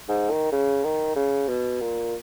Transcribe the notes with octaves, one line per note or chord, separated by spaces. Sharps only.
G#2
D#3
C#3
D#3
C#3
B2
A#2